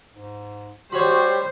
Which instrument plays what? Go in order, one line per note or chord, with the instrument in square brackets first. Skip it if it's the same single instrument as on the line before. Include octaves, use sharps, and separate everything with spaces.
[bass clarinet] G#2
[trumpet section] G3 G4 C6 [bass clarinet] F#4 [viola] C5 [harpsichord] C#5 B5